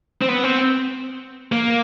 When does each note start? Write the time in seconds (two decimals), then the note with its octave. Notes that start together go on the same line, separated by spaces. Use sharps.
0.22 C4
0.28 B3
0.44 C4
1.52 A#3